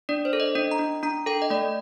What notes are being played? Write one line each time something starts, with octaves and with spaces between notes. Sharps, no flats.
D4 D5
C5
A4
D#5
D4 D#5
A#5
D4
D4 A#5
A4 G5
D#5
A3 D5